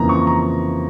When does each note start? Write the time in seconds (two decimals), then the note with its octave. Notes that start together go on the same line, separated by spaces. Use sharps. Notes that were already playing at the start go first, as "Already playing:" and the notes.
Already playing: F2 C#3 E3 A#3 A#5
0.09 C#6
0.27 A#5